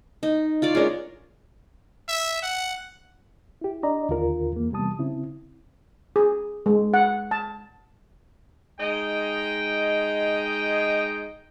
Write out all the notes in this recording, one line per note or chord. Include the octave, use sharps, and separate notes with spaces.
D#4
F4 C#5 D5
G#3 C#4 D4 F4 A#4
E5
F#5
E4 G4
D4 D5 D#5 A#5
D#2 D3 F4 A#4
E2 A#3
C3 E3 G3 B3 A5 D#6
C#3 C4 E4
G#4
G#3
F#5
A5
G#3 D#4 D#5 G5